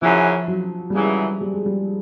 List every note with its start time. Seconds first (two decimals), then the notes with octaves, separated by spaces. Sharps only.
0.01 F#2 C#3 E3 F3
0.48 F#3
0.90 G3
0.94 F#2 C#3 E3 G#3
1.41 G3
1.54 G#3
1.66 G3